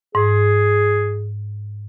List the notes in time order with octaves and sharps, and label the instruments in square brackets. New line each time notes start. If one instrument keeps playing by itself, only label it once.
[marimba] G#2 [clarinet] G#4